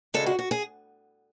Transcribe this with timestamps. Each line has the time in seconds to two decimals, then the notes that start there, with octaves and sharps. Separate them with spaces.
0.14 D2 C#3 G#3 A4
0.26 F#4
0.39 F#4
0.51 G#4